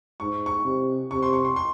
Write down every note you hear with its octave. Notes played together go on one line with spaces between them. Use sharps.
G#2 C#6
C#6
C3
C3 C#6
C6
C#6
C6
C6